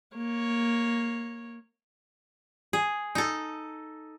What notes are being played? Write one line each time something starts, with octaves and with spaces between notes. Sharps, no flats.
A#3 C#5
G#4
D#4 A4